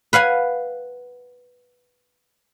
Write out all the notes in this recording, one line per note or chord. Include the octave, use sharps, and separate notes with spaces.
B4 F5 F#5 G#5